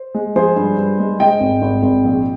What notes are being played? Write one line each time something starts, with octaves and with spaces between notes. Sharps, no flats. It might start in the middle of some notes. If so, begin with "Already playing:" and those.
Already playing: C5
G#3
F3 G#4 C5
G2
G2
G#3
G#3 D#5 G5
G#1
G#1
G#1
A#1